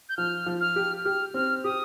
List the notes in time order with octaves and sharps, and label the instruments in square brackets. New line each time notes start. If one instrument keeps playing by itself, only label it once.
[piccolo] G6
[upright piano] F3 [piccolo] F6
[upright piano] F3
[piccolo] F6
[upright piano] G4
[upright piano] G4 [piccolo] F6
[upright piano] C4 [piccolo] F6
[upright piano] G4 [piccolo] D#6